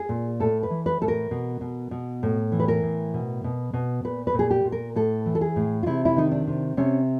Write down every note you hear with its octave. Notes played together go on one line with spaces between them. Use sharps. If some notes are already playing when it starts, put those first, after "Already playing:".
Already playing: G#4
A#2
A2 A4
B4
E3
B4
A2 A4
A#4
B2
B2
B2
A2
E3
B4
A#4
A2
B2
B2
B2
A#2 B4
B4
A#2 G#4
G4
A#2
A#4
A2 A4
E3
A4
G#4
A2
F4
C3 E4
E4
D#3 D#4
D4
C3
C3 C#4